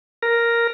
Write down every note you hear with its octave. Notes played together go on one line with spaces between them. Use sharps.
A#4